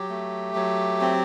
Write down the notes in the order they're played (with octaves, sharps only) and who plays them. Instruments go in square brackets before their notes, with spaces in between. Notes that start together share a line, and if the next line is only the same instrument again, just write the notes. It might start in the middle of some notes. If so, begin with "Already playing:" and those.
Already playing: [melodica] F#3 G4
A3
F#3
C4